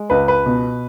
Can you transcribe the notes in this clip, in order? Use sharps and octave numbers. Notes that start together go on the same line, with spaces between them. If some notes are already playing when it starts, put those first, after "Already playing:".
Already playing: G#3
C#2 B4
B4
B2